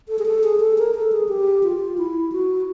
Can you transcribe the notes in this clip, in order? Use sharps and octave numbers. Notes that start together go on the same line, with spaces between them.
A4
G#4
A4
G#4
A4
A#4
A4
G#4
G4
F4
E4
F#4